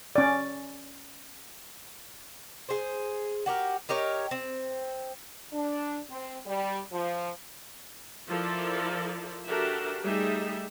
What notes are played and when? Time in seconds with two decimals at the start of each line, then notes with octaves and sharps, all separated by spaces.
0.16 C#4 D5
2.69 G#4 C5
3.46 F#4 G4 A#4
3.89 D#4 G4 A#4 C#5
4.31 C4
5.53 D4
6.10 C4
6.46 G3
6.92 F3
8.27 F3 E4 F4 A4 A#4 D5
9.46 D4 F#4 G4 A4 A#4 E5
10.04 G3 A3 D#4 G#4 E5